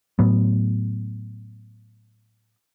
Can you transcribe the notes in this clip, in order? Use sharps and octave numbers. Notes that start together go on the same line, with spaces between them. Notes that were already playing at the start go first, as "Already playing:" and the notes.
A2 F#3 B3